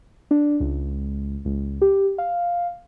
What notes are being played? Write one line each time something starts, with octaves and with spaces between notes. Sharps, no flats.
D4
C#2
C#2
G4
F5